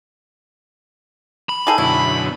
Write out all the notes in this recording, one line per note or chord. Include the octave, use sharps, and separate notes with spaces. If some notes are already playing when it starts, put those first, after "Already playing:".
B5
D#3 G#4 A4
F#2 B2 D3 E4